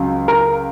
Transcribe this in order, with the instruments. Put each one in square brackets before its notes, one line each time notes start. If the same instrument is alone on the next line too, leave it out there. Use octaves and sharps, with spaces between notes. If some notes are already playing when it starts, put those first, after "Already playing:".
Already playing: [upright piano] C#2 C#3 F#3
A#4